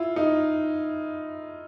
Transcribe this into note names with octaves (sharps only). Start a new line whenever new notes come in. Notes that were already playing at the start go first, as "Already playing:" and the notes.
Already playing: E4 F4
D#4